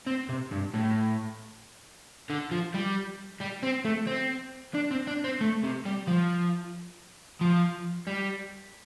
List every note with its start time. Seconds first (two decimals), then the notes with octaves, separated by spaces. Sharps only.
0.06 C4
0.29 C3
0.52 G2
0.74 A2
2.30 D3
2.51 F3
2.74 G3
3.40 G3
3.63 C4
3.85 A3
4.07 C4
4.74 D4
4.91 C4
5.07 D4
5.24 C4
5.41 A3
5.63 C3
5.85 G3
6.07 F3
7.41 F3
8.07 G3